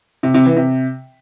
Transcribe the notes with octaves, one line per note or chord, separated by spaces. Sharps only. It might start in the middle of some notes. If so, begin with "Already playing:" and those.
C3
C3
E3
C3